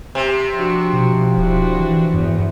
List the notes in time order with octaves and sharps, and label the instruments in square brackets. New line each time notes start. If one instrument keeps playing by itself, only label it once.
[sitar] C3
[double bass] F3 [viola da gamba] D4 F#4
[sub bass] B2
[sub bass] D#1 [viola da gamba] D4 E4 F#4
[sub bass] E3
[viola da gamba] E2 [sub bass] G2